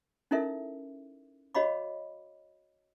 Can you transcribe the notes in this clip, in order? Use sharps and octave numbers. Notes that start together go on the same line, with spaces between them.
C#4 D#4 E4 A4 A#4 E5
F#4 C#5 D#5 F5 B5 D6